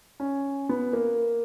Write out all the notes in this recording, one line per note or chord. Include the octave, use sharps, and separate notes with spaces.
C#4
B3
A#3